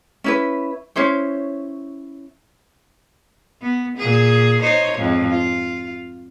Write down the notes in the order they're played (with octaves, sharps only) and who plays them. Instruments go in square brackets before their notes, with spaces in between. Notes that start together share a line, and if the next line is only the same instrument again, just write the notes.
[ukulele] C#4 E4 B4
C#4 E4 C5 C#5
[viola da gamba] B3
A#2 G#4
D#4 C5 C#5
F2 G#2
F4